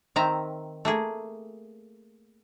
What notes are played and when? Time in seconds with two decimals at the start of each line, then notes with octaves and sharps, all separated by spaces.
0.16 D#3 C4 E5 A#5
0.85 A3 A#3 G#4